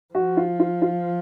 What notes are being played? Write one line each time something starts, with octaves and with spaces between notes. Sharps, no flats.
F3 F#4
F4
F4
F4